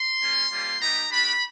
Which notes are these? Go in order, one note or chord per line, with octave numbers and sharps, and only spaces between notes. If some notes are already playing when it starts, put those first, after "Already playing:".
Already playing: C6
A#3 C#4 F4
G3 A#3 C#4 F4
G3 B3 D#4 G4 A#5
A3 D4 G4 B5